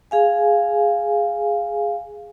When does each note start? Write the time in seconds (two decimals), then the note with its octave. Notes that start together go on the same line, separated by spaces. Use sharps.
0.11 G#4 F5 G#5